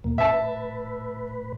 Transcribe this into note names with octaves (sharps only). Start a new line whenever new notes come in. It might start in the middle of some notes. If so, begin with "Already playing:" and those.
D#2 B2 A#3
A2 B4 E5 A5